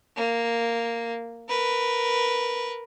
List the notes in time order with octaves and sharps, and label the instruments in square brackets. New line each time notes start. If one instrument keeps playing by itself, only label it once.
[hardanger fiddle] A#3
A#4 B4